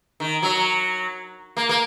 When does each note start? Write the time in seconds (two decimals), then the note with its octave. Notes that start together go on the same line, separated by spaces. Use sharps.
0.20 D#3
0.43 F#3
1.57 A#3
1.69 A#3